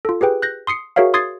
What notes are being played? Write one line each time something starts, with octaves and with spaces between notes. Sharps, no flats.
F4 A4
G4 G#4 B4 G5
F#6 G6 A#6
C6 D#6 C7 C#7
F#4 G#4 A#4 C#5 E5 F5
C6 D#6 G#6 A6 C7